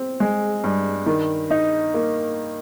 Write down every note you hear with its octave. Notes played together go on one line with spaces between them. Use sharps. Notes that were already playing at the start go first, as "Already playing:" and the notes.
Already playing: C4
G#3
G2
D#3
D#4
A#3